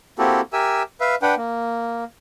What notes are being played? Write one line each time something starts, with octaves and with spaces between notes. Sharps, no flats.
A#3 C4 E4 F#4 G4 A4
G4 A#4 E5 G#5 E6
B4 E5 F5
D4 B4 F#5 G5
A#3